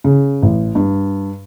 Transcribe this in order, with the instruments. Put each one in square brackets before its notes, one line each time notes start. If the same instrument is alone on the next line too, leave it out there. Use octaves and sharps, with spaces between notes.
[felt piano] C#3
A1
G2